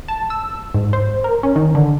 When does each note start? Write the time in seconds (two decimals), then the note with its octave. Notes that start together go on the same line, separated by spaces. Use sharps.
0.08 A5
0.30 E6
0.74 G#2
0.93 C5
1.24 A#4
1.43 C#4
1.56 D#3
1.75 D3